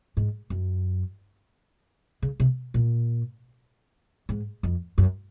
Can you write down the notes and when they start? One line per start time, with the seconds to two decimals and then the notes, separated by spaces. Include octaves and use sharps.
0.17 G#2
0.50 F#2
2.22 C#3
2.40 C3
2.74 A#2
4.29 G#2
4.63 F2
4.98 F#2